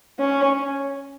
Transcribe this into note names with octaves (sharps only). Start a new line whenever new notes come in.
C#4